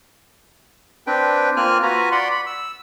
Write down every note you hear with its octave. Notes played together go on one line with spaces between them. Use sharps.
C4 D4 B4 G5
A#3 C4 F4 G#5 F6 F#6
F4 F#4 B4 G#5 A#5
D5 F#5 B5 C6
B5
E6